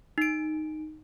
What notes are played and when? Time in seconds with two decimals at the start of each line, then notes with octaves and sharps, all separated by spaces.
0.18 D#4 D7